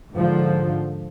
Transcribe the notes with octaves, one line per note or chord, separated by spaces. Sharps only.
G#2 D3 F3